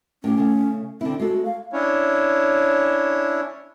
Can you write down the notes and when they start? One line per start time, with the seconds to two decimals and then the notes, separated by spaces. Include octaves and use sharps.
0.24 A2 C#4 G4
0.37 C#3 A3
1.01 D3 C4 E4
1.20 G#3 F#4 A4
1.45 F5
1.73 C#4 D4 E4 C#5